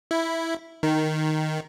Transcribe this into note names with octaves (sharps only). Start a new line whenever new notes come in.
E4
D#3